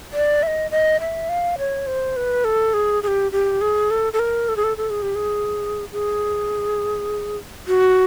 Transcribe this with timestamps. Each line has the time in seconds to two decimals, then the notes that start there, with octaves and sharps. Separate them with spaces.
0.13 D5
0.43 E5
0.47 D#5
0.71 D#5
1.00 E5
1.29 F5
1.58 C#5
1.87 C5
2.16 B4
2.45 A4
2.74 G#4
3.03 G#4
3.08 G4
3.32 G4
3.61 G#4
3.91 A4
4.13 A4
4.19 A#4
4.49 A4
4.57 G#4
4.64 A4
4.77 A4
4.90 G#4
5.02 G4
5.15 G#4
5.93 G#4
7.68 F#4